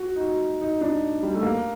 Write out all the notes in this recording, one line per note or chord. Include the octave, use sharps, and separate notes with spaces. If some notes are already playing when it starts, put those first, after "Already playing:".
Already playing: F#4
D#4
F#4
D#4
D4
G3
A3
A#3